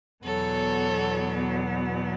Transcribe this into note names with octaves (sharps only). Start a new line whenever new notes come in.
E2 B2 F#3 B3 A4 C#5